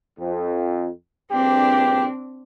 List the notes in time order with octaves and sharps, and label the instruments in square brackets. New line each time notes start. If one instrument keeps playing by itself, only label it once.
[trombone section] F2
[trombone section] A#1 G2 G4 [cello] C4 D4